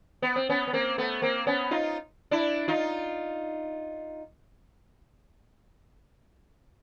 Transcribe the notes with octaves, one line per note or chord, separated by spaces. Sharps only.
B3
C4
B3 C#4
B3
A#3 C4
A3 B3
A#3 C4
B3 C#4
D#4 F4
D4 E4
D#4 F4